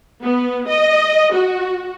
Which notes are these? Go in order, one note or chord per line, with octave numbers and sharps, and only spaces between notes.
B3
D#5
F#4